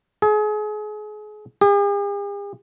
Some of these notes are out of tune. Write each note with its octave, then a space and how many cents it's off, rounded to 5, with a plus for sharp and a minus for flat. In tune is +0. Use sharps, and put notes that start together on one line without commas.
G#4 +35
G#4 -45